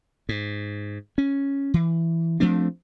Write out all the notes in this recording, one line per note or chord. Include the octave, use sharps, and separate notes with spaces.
G#2
C#4
E3
F3 A3 C4 D4